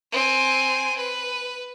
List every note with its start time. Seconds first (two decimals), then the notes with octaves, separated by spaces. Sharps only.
0.12 C4 G#5
0.97 B4